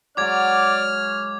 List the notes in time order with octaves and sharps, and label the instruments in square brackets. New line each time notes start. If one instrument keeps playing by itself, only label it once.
[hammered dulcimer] F#3 G#3 F#4 [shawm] D5 [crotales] D6 G#6 [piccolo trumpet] F6